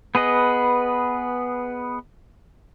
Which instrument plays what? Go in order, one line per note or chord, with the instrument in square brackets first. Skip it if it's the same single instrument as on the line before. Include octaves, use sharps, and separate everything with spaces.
[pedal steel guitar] B3 G#4 B4 D#5